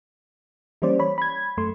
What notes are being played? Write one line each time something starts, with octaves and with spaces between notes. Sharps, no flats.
E3 G3 A#3 C#4 C5 D5
C#5 B5
B5 G#6
F#2 A3 C6